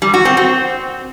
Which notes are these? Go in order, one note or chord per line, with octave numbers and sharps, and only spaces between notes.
G3
F#4
C4
C4